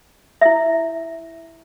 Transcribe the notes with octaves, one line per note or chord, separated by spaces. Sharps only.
E4 E5